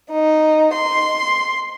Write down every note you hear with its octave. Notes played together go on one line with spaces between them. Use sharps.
D#4
C6